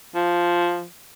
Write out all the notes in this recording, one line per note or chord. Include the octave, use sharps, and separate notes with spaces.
F3